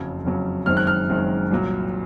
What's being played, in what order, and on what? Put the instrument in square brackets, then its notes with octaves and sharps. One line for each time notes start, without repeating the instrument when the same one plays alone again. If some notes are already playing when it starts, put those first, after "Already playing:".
Already playing: [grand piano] F#1 F2 C#3 F#3
F#1 F2 C#3 F#3
F#1 F#2 D#3 G#3 C4 F6
F#6
F6
F#1 F#2 D#3 G#3 C4
C2 A#2 F#3